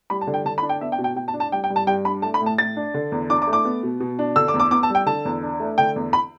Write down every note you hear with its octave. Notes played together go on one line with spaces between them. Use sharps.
G3 B5
A5
D3
G5
D3 A5
B5
D4
G5
B3 E5
G5
B2
G5
B2 G5
A5
D4
A5
G3 G5
G5
G2
A5
G2 G5
D4 B5
A3 A5
B5
A2
A5
A2 A6
D4
D3
E2
D4 D6
D6
A3
D6
B3
B2
B2
D4
D3 E6
D6
E2
D6
B3 D6
A5
G3
G5
D3 A5
E2
D4
A3
D3 G5
E2
B5